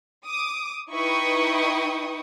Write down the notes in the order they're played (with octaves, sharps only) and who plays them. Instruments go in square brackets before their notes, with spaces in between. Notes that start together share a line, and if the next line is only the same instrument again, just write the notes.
[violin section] D6 D#6
D#4 E4 B4 G5 C#6 D#6